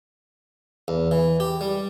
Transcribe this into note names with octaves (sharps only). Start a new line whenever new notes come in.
E2
E3
G4
G3